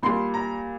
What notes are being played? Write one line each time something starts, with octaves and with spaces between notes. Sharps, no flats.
A#2 G3 C6
A#5